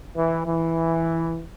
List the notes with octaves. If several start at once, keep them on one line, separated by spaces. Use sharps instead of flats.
E3
E3